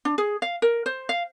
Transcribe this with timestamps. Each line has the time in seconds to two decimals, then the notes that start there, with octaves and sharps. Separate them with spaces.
0.05 D4
0.18 G#4
0.42 F5
0.62 A#4
0.86 C5
1.09 F5